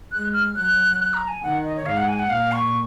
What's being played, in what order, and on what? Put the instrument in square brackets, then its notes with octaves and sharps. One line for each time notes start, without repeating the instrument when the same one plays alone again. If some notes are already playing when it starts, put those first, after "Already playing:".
[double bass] G#3 [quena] F#6
[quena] F6
[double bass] F#3 [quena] F#6
[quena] F#6
A#5
G#5
[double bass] D#3 [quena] F#5
[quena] D#5
C#5
[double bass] G#2 [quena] F5
[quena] F#5
G#5
F#5
[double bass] A#2 [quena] F5
[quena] C#6